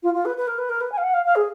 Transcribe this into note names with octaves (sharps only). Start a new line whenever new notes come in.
F4
F4
B4
B4
A#4
B4
A#4
B4
G#5
F5
F#5
F5
F5
G#4